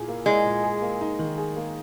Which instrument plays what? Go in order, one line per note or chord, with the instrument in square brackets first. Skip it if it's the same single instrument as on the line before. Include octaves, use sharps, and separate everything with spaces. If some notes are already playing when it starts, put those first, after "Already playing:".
Already playing: [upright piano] A#2 E4 G#4
A#3
[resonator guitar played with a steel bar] G#3 [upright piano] E4
[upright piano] A#2
G#4
A#3
D#4
D#3
G#4
A#3